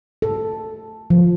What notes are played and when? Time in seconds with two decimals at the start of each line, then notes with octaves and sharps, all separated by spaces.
0.22 A4
1.10 F3